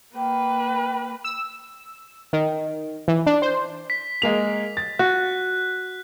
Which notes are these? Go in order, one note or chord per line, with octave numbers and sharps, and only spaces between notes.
A#3 B4 G5
E6
D#3
E3
D4
C5
B6
G#3 A#3 F7
A6
F#4 F#6